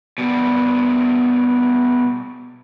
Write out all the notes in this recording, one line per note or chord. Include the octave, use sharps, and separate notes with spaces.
B2 G3